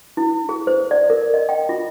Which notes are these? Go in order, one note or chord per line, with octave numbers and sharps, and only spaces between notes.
E4
G#4
C5
D5
A#4
D#5
G5
F4